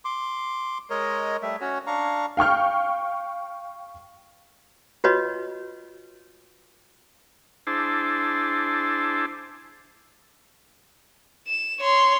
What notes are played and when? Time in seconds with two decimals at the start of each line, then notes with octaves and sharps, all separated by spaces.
0.05 C6 D6
0.90 G#3 A#4 C#5 D#5
1.42 G3 A3 E5
1.61 C#4 F#4 C#5
1.87 D4 F5 A#5 C#6
2.37 F5 G5 C#6 F6
5.04 F4 F#4 B4 C#5 D#5
7.67 D4 E4 G#4 C5 A5
11.47 E7
11.80 C#5 C6